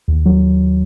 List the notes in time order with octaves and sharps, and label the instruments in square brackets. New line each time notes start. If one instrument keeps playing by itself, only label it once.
[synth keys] D#2
F#3